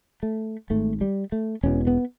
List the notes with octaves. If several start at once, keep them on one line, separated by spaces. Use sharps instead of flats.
A3
G#1 G#2 A3
G3
A3
E1 E2 B2 C#4
B3